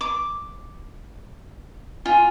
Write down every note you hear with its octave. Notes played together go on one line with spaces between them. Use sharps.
D6
F4 G#5